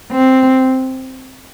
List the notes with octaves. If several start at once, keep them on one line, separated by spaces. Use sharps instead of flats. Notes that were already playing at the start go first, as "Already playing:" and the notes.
C4